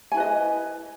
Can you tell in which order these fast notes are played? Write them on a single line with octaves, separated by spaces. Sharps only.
G#5 E4 B4 D#5